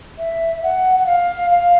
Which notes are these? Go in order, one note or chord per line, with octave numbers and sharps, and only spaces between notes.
E5
F#5
F#5
F5
F5